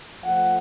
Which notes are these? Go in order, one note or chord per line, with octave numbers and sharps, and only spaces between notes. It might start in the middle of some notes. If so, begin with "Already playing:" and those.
F2 F3 A3 F#5